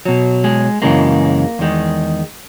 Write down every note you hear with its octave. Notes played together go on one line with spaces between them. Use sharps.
B2 F#3
G#3
F#2 C#3 E3 G#3 A#3
E2 D#3 G#3